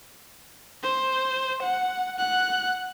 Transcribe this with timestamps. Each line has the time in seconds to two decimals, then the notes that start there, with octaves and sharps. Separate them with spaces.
0.83 C5
1.63 F#5
2.18 F#5 F#6